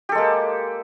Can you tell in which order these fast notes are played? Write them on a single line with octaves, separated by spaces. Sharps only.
G4 A4 G#3 A#3